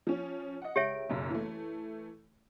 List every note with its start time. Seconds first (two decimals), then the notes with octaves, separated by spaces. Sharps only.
0.07 F3 C#4
0.62 D#5 F#5
0.76 C#2 G4 C#5 E5 D7
1.09 F#1 B1 F#2
1.30 E3 A3